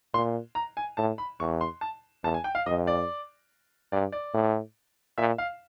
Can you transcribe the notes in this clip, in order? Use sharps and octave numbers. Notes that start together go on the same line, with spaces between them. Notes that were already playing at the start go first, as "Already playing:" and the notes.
A#2 C6
A#5
G#5
A2 A5
B5
E2 C#6
C6
A5
E2 A5
G#5
G5
F5
F2 D#5
D5
G2 D5
D5
A2
A#2 E5
F5